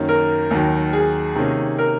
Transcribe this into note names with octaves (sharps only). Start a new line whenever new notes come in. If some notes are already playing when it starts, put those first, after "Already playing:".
Already playing: F#2 D#3 A#3 C#4
A#4
D#2 D#3 F#3
G#4
C3 D#3 A#3 C#4
A#4